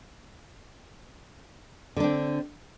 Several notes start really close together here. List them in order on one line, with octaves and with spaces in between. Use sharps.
D3 D4 C4